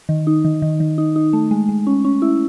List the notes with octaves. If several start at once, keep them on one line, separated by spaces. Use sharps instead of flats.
D#3
D#4
D#3
D#3
D#3
D#4
D#4
A3
G#3
G#3
C#4
C#4
E4